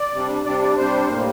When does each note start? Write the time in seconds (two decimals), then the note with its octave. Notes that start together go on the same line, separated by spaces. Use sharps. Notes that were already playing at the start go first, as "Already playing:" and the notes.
Already playing: D5
0.14 C3 G3 D4
0.46 C3 G3 D4 D5
0.62 D5
0.77 C3 G3 D4 C5
1.09 A2 G3 A#3